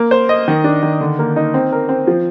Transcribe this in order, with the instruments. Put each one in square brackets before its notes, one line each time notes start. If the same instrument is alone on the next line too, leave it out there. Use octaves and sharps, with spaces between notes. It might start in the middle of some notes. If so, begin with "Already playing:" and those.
Already playing: [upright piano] A#3
C5
D#5
D#3
D4
D#3
D3
A#3
D#4
C4
A#4
C4
F3